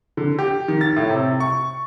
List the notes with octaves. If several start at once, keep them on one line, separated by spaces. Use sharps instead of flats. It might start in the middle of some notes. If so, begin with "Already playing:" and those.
D3
G4
D#3
A6
A2
C3
C#6